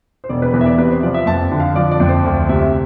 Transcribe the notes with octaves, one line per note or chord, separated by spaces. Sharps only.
C5
E1 D5
B4
E2 B4
E5
D5
C3 B4
C5
F3 D5
E5
F2 A5
D3
F5
F3 D5
D5
F2
C5
D2
C3 E5